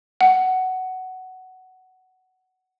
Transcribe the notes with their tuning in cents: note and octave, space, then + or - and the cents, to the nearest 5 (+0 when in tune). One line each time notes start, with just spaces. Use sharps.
F#5 +10